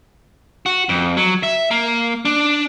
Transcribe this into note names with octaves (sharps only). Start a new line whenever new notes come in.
F#4
F2
F#3
E5
A#3
D4